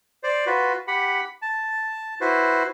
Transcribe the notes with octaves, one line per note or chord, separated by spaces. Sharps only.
C5 D5
F4 F#4 B4
G4 F#5 B5
A5
E4 F#4 B4 C5